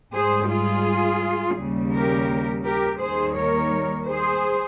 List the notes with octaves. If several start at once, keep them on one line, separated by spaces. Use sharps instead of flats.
G#2 G3 G#4 C5
F4 G#4
D#2 C#3 G3
G4 A#4
G4 A#4
D#2 D#3 G3 G#4 C5
A#4 C#5
G#4 C5